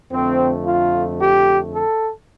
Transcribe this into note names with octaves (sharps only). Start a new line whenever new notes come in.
F2 D3 A3 C4
F4
G4
A4